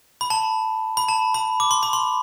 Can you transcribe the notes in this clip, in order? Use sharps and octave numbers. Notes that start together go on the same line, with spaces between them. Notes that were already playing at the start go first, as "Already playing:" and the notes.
B5
A5
B5
A5
B5
D6
C6
B5
C6